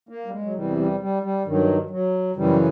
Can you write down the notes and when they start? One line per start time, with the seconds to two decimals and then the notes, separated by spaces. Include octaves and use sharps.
0.09 A#3
0.26 G3
0.31 G#3
0.43 F#3
0.54 E2 C3 E3 G3
0.77 G3
1.00 G3
1.22 G3
1.45 G2 D#3 F#3
1.90 F#3
2.36 F#2 C#3 E3 G3